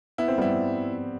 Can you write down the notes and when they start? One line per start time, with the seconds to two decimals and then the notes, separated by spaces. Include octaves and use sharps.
0.18 B3 E4
0.28 C4
0.38 G3 B3 E4